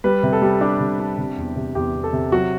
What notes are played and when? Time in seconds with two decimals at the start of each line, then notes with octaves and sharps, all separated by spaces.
0.04 G3 B4
0.23 C3
0.33 A4
0.42 G3
0.61 D4 G4
0.80 C3
1.00 D4
1.18 C3
1.37 E2
1.56 C3
1.75 E2 G4
1.94 E2
2.04 A4
2.13 C3
2.32 F#3 F#4